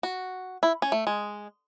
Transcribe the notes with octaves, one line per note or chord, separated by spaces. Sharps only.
F#4
E4
C#4
A3
G#3